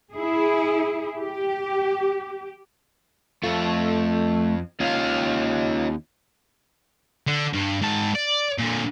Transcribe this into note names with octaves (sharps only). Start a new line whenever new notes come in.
E4 G#4
G4
F2 A3 F4
D#2 C#4 F4 F5
D3
G2
G#2 A5
D5
A#2 D3